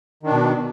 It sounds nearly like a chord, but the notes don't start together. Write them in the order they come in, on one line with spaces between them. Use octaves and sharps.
D#3 D4 B2